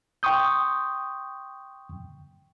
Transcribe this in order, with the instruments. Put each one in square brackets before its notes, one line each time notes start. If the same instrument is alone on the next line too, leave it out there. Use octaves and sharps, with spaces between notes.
[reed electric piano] G5 C6 C#6 D#6 G6